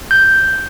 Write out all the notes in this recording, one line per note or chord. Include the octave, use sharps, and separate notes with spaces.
G6